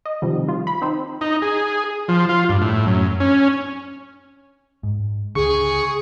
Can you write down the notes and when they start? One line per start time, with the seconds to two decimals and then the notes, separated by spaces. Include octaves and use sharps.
0.05 D#5
0.22 C3 D#3 F3 G3
0.48 F4
0.67 B5
0.82 C4 D#4 C5
1.21 D#4
1.42 G#4
2.08 F3
2.29 F4
2.49 G2
2.61 A2
2.86 F#2
3.20 C#4
4.83 G#2
5.35 C#2 D3 G#4 C#6